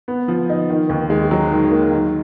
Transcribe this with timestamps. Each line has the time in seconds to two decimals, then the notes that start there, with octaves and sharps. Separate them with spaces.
0.08 B3
0.28 F3
0.50 D#4
0.70 D#3
0.90 D#2
1.10 G#3
1.31 F#3
1.52 D#3
1.72 A#3
1.91 D#3